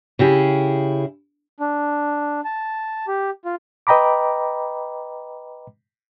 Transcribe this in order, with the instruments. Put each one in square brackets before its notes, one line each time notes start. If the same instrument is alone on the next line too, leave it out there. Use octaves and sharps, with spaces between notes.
[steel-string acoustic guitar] C#3 E4 G4 G#4
[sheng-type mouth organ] D4
A5
G4
F4
[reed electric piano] B4 D#5 G5 A#5 B5 D6